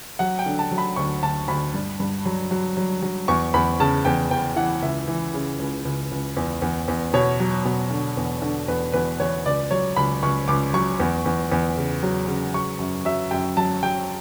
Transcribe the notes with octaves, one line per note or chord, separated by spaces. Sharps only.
F#3 F#5
G5
D3
A5
F#3
B5
D2 C#6
D2 A5
D2 B5
G2
G2
F#3
F#3
F#3
F#3
E2 C#6
E2 B5
C#3 A5
E2 G5
E2 G5
E3 F#5
C#2 E5
E3
C#3
C#2
C#2
C#2
E2
E2
E2
B2 C#5
F#3
B2
D3
E2
D3
E2 B4
E2 B4
E2 C#5
C#2 D5
F#3 C#5
C#2 B5
C#2 C#6
C#2 D6
F#3 C#6
E2
E2
E2
C#3
F#3
C#3
F#3 C#6
F#2
F#3 E5
F#2 G5
F#3 A5
F#3 G5